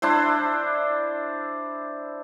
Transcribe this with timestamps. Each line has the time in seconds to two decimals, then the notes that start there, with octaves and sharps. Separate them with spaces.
0.02 D4 E4 C5